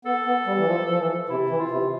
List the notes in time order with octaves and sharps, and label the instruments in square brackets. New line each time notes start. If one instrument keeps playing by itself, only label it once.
[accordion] B3 [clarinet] A4
[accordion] B3
G3
E3
F3
F3
E3
[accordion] C3 [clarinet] E4
[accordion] E3
[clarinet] F4
[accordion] C3